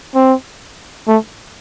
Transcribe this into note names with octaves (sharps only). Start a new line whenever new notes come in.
C4
A3